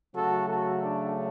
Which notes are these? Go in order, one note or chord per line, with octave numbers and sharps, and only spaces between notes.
C#3 F#3 A3 F#4 A4
F#4 A4
D4